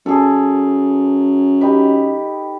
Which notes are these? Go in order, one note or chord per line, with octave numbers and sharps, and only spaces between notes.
F#2 G#4 A4
D#4 G4 B4